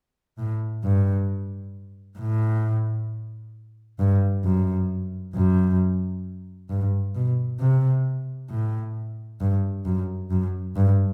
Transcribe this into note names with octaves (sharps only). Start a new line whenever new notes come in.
A2
G2
A2
G2
F#2
F#2
G2
B2
C3
A2
G2
F#2
F#2
G2